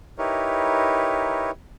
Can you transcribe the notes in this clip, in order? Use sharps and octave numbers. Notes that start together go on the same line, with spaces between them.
D#4 E4 G4 A#4 B4 C#5